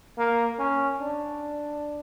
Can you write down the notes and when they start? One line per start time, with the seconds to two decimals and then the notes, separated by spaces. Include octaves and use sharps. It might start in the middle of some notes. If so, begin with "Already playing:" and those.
0.18 A#3
0.59 C#4
1.01 D4